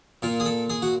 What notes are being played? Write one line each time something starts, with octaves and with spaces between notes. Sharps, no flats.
A#2 F4
G#4
A4
G#4
F#4